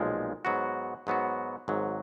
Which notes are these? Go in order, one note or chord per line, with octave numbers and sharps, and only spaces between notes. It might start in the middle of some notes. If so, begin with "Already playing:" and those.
Already playing: B1 A#2 F3 G#3
G#2 F#3 B3 F#4
G#2 F#3 B3 F#4
G#1 G#2 F#3